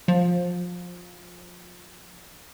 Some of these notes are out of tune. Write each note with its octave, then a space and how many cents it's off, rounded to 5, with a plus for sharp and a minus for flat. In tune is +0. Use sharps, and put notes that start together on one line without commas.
F3 +25